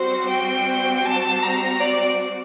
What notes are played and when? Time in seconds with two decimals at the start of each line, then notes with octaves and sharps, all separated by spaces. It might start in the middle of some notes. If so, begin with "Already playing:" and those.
Already playing: G3 C4 F#4 C5
0.30 G5
1.06 A5
1.43 A#5
1.80 D5